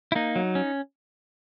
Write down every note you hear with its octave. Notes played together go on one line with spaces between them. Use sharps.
E4
A#3 D#4
F#3
C#4